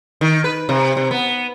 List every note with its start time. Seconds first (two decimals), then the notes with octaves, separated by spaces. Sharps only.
0.21 D#3
0.44 B4
0.69 C3
0.97 C3
1.11 B3